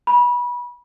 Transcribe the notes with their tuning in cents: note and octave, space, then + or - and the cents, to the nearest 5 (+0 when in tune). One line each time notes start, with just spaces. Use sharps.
B5 -25